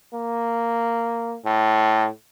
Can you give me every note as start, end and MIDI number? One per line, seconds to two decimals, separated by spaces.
0.14 1.36 58
1.45 2.08 45